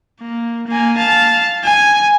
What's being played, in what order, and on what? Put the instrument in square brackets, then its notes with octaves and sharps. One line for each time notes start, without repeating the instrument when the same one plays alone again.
[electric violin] A#3
A#3 G#5
F5 A5
G#5